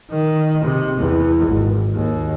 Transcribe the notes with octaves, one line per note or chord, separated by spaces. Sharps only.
D#3
C3
E2
G#1
D#2